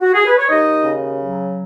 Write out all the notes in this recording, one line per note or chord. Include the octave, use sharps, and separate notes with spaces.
F#4
G#4
B4
C#5
D#2 D#4 D#5
C#3
F#3